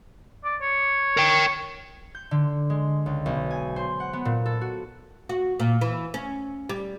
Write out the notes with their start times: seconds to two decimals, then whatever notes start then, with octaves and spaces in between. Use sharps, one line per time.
0.44 D5
0.62 C#5
1.17 A#4 G5
2.15 G6
2.31 D3
2.70 G#3
3.06 C#2
3.26 B1
3.51 G#5
3.76 C5
4.00 F#5
4.13 B3
4.25 A#2
4.46 A4
4.61 F#4
5.29 F#4
5.60 A#2
5.81 E3
6.14 C#4
6.69 G3